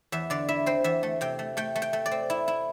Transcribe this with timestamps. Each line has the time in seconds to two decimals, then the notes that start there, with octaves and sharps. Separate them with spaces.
0.12 E2 E5
0.30 D3 D5
0.49 E4 E5
0.66 C4 C5
0.84 E2 E5
1.03 A3
1.21 C3 G5
1.39 A3
1.57 A3 G5
1.76 A3
1.82 G5
1.93 A3
2.06 D5
2.11 C4
2.30 E4
2.48 E4